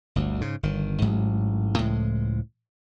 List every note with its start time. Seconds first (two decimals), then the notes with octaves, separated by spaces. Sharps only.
0.16 G1 D2
0.41 G#2 C#3
0.63 G1 D#3
1.02 A1 G#2 F#3
1.79 C#2 A2 F3 G#3